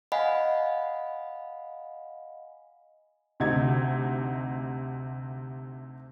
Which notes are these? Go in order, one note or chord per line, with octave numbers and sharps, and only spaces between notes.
D#5 F5 F#5 G#5 B5
D2 C3 D#4 G#6